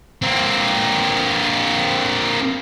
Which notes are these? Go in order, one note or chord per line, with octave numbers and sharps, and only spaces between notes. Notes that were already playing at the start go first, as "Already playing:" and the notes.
A#3 C4